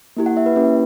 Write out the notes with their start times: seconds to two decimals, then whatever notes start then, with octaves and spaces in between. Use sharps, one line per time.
0.17 A#3 E4 G4
0.26 F#5
0.37 E5
0.46 B4
0.56 A#3 C#4 E4 G4 B4